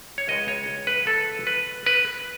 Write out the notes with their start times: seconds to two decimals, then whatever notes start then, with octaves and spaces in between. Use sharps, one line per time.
0.18 C#5
0.28 C#2 C#3 G#3 D#5
0.48 C#5
0.87 B4
1.07 A4
1.47 B4
1.86 B4